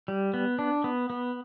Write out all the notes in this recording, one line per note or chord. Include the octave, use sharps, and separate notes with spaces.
G3
B3
D4
B3
B3